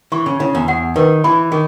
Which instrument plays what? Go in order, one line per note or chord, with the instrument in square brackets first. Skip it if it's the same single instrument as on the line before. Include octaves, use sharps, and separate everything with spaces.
[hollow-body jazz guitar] E3 [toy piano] C#6
[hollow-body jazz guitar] C#3
[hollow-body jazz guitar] C#3 [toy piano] E4
[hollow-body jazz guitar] E2
[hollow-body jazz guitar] E2 [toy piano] F#5
[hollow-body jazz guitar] D#3 [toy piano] B4
[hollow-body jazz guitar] E3 [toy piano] B5
[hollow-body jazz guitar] D#3 [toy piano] G#4